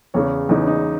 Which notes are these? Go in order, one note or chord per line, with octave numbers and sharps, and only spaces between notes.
E2 C#3 E3 C#5
E2 C#3 E3 D#4
D#4